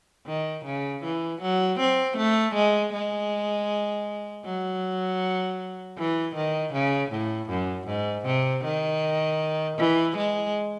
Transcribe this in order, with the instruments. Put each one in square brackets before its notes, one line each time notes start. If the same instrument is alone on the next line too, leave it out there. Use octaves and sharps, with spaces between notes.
[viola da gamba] D#3
C#3
E3
F#3
C4
A3
G#3
G#3
F#3
E3
D#3
C#3
A2
F#2
G#2
C3
D#3
E3
G#3